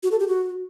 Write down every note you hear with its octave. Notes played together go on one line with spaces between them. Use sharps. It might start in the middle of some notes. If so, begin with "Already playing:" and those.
F#4
A4
G4
F#4